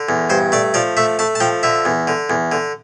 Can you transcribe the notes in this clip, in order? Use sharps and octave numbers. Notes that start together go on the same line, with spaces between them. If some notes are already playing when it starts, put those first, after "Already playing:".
Already playing: D3
E2
G2 C5
A3 D5
F3 D5
A3 E5
A3 A5
A5
F3 G5
D3 E5
E2
D3
E2
D3